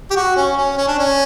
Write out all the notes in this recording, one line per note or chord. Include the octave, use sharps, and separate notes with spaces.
G4
F#4
C#4
C#4
C#4
D4
C#4